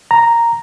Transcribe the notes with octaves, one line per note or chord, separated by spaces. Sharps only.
A#5